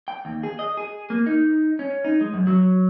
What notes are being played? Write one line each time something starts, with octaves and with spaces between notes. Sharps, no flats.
G5
D#2
G#4
D#5
G#4
A#3
D#4
C#4
D#4
G#3
F#2
F#3